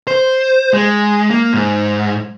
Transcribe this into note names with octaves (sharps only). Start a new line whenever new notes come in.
C5
G#3
A#3
G#2